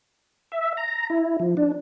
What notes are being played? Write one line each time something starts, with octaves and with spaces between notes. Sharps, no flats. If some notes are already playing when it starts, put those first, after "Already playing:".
E5
A#5
E4
F3
D4